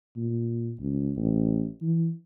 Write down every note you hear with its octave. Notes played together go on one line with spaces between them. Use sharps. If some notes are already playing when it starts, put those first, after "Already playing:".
A#2
C#2
A1
E3